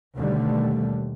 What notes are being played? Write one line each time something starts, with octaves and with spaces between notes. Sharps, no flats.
D#2 B2 D3 G3 A3